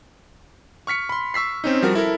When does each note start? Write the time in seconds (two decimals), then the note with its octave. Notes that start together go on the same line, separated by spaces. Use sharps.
0.87 C#6 F6 B6 C#7
1.09 B5 C6
1.34 C#6 E6 B6 C7
1.64 C4 C#4 D#4
1.82 F3 G3 F#4 A#4
1.95 E4 A4 A#4